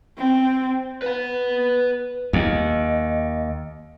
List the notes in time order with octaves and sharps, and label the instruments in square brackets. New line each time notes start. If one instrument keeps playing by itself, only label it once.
[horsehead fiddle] C4
[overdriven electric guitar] B4 F#5
[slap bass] D#2 [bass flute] D#5